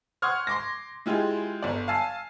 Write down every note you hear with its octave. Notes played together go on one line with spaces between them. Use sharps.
F#5 C6 C#6 D#6 F6 G#6
C6 D6 A#6
G#3 E4 F4 G4 G#4
G1 D5
F5 G#5 A5 E6 C7